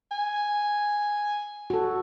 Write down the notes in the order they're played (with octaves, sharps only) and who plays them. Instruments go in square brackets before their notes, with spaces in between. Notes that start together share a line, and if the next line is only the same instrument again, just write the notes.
[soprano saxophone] G#5
[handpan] F#4 A4